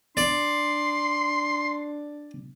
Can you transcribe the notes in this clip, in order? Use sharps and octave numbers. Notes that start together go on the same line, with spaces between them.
D4 D5 C6